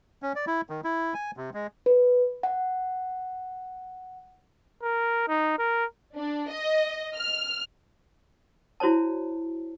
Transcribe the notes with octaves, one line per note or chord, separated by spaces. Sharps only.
C#4
D5
E4
D#3
E4
G#5
C3
G#3
B4
F#5
A#4
D#4
A#4
D4
D#5
F6
E4 F#4 C5 C#5 A5